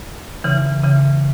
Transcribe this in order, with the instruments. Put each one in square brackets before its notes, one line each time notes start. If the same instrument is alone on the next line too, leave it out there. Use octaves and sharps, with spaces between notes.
[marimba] C#3 E3
C#3 E3